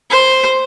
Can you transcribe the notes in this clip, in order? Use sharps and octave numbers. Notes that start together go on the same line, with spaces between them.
C5